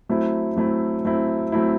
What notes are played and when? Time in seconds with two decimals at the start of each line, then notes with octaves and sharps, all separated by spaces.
0.09 F#3 A3 C4 E4
0.57 F#3 A3 C4 E4
1.05 F#3 A3 C4 E4
1.52 F#3 A3 C4 E4